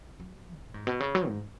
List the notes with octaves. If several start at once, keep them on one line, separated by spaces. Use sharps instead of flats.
F#3
B2
G#2
B2
C#3
F#3
G#2